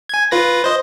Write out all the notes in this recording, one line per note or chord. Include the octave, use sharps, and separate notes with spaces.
G#5 G#6
F4 B4 A#6
C5 D#5